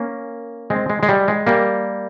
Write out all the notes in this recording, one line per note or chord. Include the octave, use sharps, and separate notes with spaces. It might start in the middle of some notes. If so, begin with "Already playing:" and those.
Already playing: A#3 C#4
G#3 C4
G#3
G#3
G3
G#3
G3 A#3